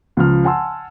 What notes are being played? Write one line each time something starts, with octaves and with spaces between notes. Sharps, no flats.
C#2 F3 F6
F#5 G#5 A5 C6 E6